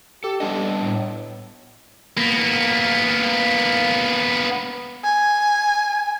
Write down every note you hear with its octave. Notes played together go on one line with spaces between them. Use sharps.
G4 A4
G3 B3 D4 D#5
A2
A#3 B3
G#5